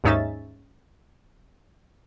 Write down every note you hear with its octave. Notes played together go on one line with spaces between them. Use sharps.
D#2 G#2 C#4 D#4 E5 A6